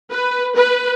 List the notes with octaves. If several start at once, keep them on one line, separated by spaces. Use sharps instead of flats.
B4
B4